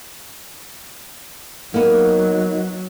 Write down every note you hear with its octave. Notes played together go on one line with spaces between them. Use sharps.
F#3 A#3 B3 D#4